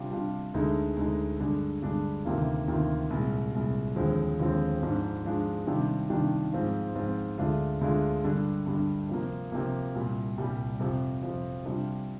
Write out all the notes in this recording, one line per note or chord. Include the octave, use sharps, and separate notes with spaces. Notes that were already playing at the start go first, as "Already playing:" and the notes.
Already playing: C3 G3 D4 F4
C3 G3 D4 F4
D2 D3 G#3 D#4
D2 D3 G#3 D#4
G2 D3 G#3 D4
G2 D3 G#3 D4
D2 C3 D#3 A#3 F4
D2 C3 D#3 A#3 F4
C2 A#2 G#3
C2 A#2 G#3
D#2 D3 F3 G#3 C4
D#2 D3 F3 G#3 C4
G#2 F3 G#3 D4 F4
G#2 F3 G#3 D4 F4
C3 D#3 G3 D4 F4
C3 D#3 G3 D4 F4
G#2 F3 C4 F4
G#2 F3 C4 F4
D2 D3 G#3 D4 F4
D2 D3 G#3 D4 F4
G2 D3 G3 D4
G2 D3 G3 D4
C3 F3 A#3
C3 F3 A#3
C2 A#2 G3
C2 A#2 G3
F2 C3 F3
F2 C3 F3
C3 G3 D4 F4